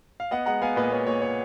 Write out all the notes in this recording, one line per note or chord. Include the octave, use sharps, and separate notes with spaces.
F5
B3 D#5 F#5
G#3 F#5 A#5
B3 F5 G#5
A#2 B4 D#5
B3 C#5
A#2 C#5
C#5